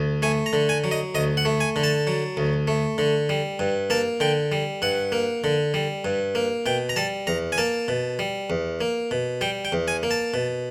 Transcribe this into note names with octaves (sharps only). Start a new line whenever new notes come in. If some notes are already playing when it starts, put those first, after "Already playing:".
Already playing: D2
A3 G#5
A#5
D3
G#5
F#3
D#5
D2 D#5
F#5
A3
G#5
D3
A5
F#3
D2
A3
D3
G3
G2
A#3 A5
D3 G5
G3
G2 F#5
A#3
D3
G3
G2
A#3
B2 G5
A#5
G3 A5
E2 A#5
G#5
A#3 A5
B2
G3
E2
A#3
B2
G3 G5
G5
E2
G#5
A#3
A5
B2